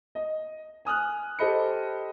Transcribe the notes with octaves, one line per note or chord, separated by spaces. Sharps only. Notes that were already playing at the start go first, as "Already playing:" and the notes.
D#5
G#5 D#6 F6 F#6
G4 A4 C5 D#5 B5 C#7